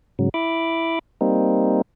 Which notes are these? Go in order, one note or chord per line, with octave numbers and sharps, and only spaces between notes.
G#2 C#3 F#3
E4 B5 D6
G3 A#3 C4 D#4